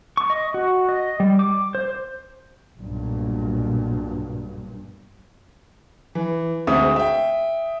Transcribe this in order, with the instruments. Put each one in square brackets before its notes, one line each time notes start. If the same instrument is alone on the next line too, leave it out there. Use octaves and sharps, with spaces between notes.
[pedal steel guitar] C#6
D#5
F#4
D#5
G3
D6
C5
[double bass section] B1 G2 A#2
[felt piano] E3
D2 G#3 C4 E5 D#6
E5 G5